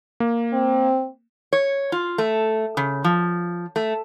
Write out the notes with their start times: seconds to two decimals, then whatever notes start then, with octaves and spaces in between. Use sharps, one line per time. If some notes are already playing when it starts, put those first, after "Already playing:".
0.20 A#3
0.53 C4
1.53 C#5
1.92 F4
2.18 A3
2.77 C#3
3.04 F3
3.76 A3